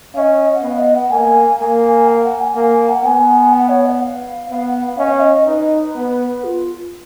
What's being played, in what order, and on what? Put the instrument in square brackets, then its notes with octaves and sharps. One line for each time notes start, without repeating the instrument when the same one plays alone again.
[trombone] C#4 [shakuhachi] D#5 F5
[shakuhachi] F#5
[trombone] B3 [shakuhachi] F5
[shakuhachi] D#5
F#5
[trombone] A#3 [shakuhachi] G#5
[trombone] A#3 [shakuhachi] G#5
[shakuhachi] G#5
F5
F#5
G#5
[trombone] A#3
[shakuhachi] G#5
F#5
[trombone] B3 [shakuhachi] G#5
[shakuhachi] F#5
C#5
F#5
F5
[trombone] B3 [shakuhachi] F5
[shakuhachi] F#5
F5
[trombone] C#4 [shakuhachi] D#5
[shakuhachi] F5
D#5
[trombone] D#4 [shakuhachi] B4
[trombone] B3
[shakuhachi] F4